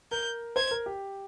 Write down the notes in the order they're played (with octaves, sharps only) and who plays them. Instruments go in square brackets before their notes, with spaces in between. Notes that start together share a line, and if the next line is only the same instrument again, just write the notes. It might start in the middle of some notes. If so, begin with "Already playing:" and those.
[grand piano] A#4 [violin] G6
[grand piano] C5 [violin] G#6
[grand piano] A#4
G4